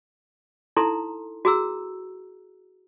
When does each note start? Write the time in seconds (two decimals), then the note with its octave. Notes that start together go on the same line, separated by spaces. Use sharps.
0.76 D#4 E4 A4 A#5 C6
1.45 F#4 G#4 A#5 E6